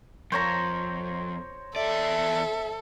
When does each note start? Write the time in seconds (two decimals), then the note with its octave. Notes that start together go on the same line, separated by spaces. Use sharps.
0.32 F2 C5 C#5 A#5
1.76 E2 A4 D5 E5